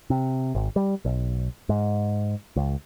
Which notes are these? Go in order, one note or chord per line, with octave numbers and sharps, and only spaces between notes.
C3
G#1
G3
B1
G#2
C#2